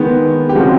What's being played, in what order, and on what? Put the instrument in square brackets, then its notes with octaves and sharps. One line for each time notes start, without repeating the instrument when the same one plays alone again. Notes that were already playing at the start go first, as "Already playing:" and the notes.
Already playing: [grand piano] D#3 G#3 B3
G4
C#3 F3 G#3 C4 F#4